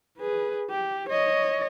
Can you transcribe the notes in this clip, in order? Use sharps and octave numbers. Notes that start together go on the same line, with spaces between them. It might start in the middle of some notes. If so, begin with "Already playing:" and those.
G#4 B4
G4
C#5 D#5